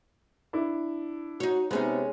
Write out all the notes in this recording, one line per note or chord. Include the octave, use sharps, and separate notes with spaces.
D4 E4
D#4 F#4 C#5
C3 G#3 B3 C#4 D#4